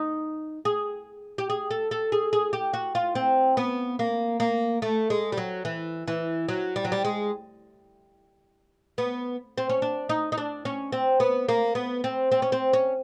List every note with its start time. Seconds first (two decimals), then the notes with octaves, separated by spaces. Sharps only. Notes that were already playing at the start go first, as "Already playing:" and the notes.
Already playing: D#4
0.65 G#4
1.38 G4
1.50 G#4
1.71 A4
1.91 A4
2.12 G#4
2.33 G#4
2.53 G4
2.73 F#4
2.95 F4
3.15 C4
3.57 B3
3.99 A#3
4.40 A#3
4.82 A3
5.10 G#3
5.32 G3
5.37 F#3
5.65 E3
6.07 E3
6.48 F#3
6.76 G3
6.85 F#3
6.92 G3
7.05 G#3
8.98 B3
9.58 C4
9.69 C#4
9.82 D4
10.09 D#4
10.32 D#4
10.38 D4
10.65 C#4
10.92 C4
11.20 B3
11.48 A#3
11.75 B3
12.04 C4
12.32 C4
12.42 C#4
12.52 C4
12.73 C#4